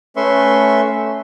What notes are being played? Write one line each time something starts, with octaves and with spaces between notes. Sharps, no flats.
A3 C#4 B4 E5 C6 C#6